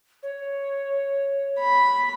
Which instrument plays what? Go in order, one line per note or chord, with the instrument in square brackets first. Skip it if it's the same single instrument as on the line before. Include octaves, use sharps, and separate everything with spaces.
[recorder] C#5
[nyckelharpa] B5